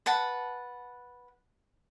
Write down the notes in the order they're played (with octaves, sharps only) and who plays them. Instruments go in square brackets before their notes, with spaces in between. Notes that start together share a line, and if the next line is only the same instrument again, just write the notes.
[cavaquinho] B4 F#5 A5